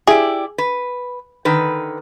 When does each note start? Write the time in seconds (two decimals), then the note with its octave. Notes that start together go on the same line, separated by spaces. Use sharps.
0.07 E4 G4 G#4 D5
0.58 B4
1.45 D3 D#3 B4